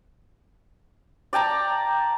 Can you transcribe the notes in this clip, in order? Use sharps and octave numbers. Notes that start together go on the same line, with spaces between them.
D5 G5 A5 A#5